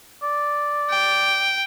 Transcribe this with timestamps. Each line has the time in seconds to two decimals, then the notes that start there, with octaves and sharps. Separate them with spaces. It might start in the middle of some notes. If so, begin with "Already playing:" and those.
0.23 D5
0.90 G5